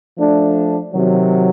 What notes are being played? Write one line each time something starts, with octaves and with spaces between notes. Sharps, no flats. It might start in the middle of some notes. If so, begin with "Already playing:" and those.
F3 A3 D4
C3 D#3 F#3